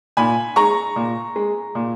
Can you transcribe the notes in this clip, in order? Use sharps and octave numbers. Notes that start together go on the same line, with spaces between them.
A#2 G#5 B5
G#3 A#5 C#6
A#2
G#3
A#2